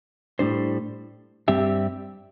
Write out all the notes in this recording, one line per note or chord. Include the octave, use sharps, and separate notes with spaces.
A2 G3 D4 C5
G2 G3 C4 G4 E5